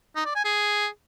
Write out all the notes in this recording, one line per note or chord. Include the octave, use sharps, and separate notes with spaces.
D#4
D5
G#5
G#4